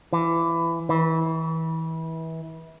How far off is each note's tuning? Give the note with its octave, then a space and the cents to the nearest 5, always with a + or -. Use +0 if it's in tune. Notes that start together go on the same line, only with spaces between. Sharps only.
E3 +20
E3 -25